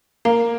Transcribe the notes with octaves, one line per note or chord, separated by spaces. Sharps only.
A#3 A#4 F5 A#5